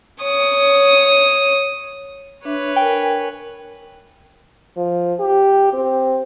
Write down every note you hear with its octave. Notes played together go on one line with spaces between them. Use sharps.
C#5 D#6
D4 B4 C#5 E5
A#4 G5 G#5
F3
G4
C4